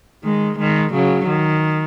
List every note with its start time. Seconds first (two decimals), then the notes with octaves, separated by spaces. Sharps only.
0.23 D#3 G#3
0.58 D#3 G#3
0.93 C#3 F#3
1.28 D#3